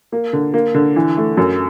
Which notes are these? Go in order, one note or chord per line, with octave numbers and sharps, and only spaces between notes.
A#3
D3
A#3
D3
E3
A3
F#2